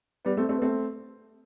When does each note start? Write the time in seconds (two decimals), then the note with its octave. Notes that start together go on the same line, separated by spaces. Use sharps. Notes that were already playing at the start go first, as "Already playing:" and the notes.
0.25 G3 B3
0.37 A3 C4
0.49 A3 C4
0.57 B3
0.62 A3 C4